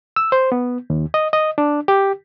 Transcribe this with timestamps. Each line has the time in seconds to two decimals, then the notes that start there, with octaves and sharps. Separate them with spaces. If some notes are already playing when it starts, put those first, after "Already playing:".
0.16 E6
0.32 C5
0.52 B3
0.90 D#2
1.14 D#5
1.33 D#5
1.58 D4
1.88 G4